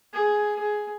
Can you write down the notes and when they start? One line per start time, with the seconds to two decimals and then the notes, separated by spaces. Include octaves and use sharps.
0.13 G#4
0.59 G#4